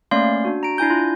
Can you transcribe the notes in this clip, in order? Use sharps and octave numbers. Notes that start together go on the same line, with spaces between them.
A3 A#3 C#4 D5 F5 C6
D4 F#4
A#5 D7
D4 E4 G#5 G6
F4